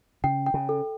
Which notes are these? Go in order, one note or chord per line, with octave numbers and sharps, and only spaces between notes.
C#3 G5
G5
C#3
A4